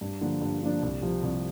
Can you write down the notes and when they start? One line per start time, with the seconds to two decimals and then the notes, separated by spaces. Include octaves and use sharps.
0.01 G2
0.21 D3 F3 A#3 D4
0.41 G2
0.62 D3 F3 A#3 D4
0.82 C2
1.02 C3 F3
1.23 C2